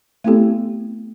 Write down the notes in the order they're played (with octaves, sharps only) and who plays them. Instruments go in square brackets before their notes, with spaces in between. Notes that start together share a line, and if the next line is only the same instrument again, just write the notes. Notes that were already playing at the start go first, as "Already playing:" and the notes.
[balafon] A3 B3 C4 E4 G4 A4